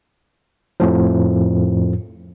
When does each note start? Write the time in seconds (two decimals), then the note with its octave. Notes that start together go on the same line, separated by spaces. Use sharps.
0.80 F2 A2 F3